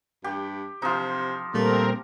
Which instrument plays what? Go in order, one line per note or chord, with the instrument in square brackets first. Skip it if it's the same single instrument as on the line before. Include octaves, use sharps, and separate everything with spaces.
[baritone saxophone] G2 [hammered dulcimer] G4
[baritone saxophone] C3 [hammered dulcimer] F3 D#4
[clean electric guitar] A#2 G3 [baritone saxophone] A3 [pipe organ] C4 A#4